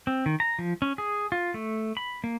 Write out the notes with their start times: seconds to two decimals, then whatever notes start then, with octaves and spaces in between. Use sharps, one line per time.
0.07 C4
0.26 D#3
0.40 A#5
0.59 F3
0.82 C#4
0.98 G#4
1.32 F4
1.54 A3
1.97 B5
2.24 A#3